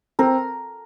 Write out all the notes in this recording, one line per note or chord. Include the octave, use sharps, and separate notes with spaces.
C4 A#4